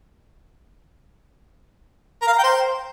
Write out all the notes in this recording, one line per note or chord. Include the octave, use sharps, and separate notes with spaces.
A#4
F5
A#5
G5
C5